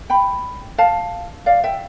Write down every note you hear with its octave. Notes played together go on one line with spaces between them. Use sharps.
G5 B5
F5 A5
D5 F5
E5 G5